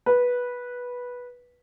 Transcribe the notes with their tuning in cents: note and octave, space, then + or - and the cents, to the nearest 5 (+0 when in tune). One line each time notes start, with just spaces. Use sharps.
B4 -10